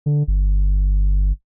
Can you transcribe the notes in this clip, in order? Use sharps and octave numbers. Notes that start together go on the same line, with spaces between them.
D3
G1